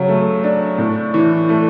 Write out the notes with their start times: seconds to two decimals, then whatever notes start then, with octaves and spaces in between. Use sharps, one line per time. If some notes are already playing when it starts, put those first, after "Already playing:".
Already playing: C#3 F#3
0.09 A3
0.44 D4
0.78 A2
1.14 E3
1.49 A3